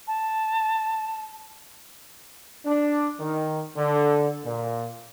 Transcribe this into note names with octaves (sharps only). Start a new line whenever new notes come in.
A5
D4
D#3
D3
A#2